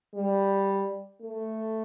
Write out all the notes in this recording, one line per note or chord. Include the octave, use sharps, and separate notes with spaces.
G3
A3